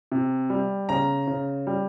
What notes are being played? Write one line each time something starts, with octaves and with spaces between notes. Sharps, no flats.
C3
G3
C#3 A#5
C#3
G3